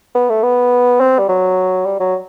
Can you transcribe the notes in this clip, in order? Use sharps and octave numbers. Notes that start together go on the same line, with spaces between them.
B3
A3
B3
C4
G3
F#3
G3
F#3